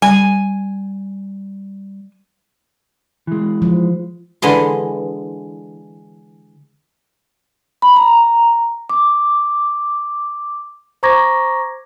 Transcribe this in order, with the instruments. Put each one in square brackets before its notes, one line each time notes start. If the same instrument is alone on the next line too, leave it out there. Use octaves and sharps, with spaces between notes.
[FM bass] G3 [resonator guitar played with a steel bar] G#5
[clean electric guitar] E3 G#3
[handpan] F3
[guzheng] D3 E3 G#3 D#5 G#5 C6
[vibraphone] B5
A#5
D6
[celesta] C5 A#5 C#6 D6 G#6 A#6